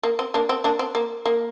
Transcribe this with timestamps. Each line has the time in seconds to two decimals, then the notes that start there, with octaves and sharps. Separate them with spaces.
0.03 A#3
0.19 C4
0.34 A#3 D4
0.49 C4
0.64 A#3 D4
0.79 C4
0.95 A#3
1.26 A#3